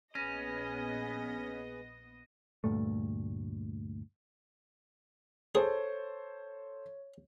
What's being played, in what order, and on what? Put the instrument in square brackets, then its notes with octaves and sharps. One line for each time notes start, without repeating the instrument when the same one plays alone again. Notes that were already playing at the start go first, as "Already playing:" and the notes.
[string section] A#1 B3 D#5 [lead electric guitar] C#4 [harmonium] G#4 B4 [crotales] A#6 D#7
[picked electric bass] D2 G2 A#2 A3
[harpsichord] G#4 [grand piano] A4 C5 [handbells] C#5